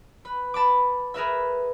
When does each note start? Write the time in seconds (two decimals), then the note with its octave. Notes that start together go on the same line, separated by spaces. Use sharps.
0.25 B4
0.54 A5 B5 D6
1.14 G#4 A#4 B4 E5